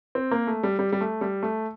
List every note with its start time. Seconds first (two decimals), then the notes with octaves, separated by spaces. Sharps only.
0.15 C4
0.31 A#3
0.47 A3
0.63 G3
0.79 G3
0.92 G3
1.01 A3
1.21 G3
1.43 A3